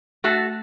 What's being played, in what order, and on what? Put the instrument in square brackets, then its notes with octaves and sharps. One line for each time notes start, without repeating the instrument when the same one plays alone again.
[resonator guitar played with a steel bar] A3 F#4 A4